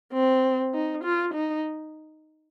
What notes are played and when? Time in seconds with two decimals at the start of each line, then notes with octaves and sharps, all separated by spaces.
0.13 C4
0.74 D#4
1.04 F4
1.34 D#4